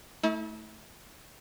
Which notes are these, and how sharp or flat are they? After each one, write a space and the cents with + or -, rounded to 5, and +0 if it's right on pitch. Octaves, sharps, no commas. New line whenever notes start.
A3 +0 E4 -40